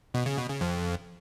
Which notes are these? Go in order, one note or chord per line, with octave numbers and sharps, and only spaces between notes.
B2
C#3
B2
C#3
F2